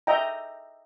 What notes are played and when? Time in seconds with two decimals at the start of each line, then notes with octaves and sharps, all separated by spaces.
0.07 D#5 E5 G5 A#5